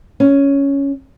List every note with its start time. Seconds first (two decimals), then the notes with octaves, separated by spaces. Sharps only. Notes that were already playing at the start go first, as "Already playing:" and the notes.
0.20 C#4